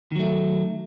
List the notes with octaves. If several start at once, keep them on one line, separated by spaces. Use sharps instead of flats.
D#3 F#3 A3